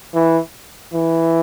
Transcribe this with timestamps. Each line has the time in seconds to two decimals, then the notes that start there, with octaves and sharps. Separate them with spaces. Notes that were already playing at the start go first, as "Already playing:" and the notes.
0.14 E3
0.93 E3